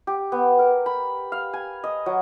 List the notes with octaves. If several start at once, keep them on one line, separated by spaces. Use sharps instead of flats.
G4
B3
A#4
B5
F5
G#5
D#5
F#3